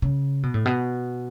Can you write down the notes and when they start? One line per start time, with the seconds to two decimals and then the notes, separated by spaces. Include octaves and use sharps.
0.02 C#3
0.43 B2
0.54 A2
0.65 B2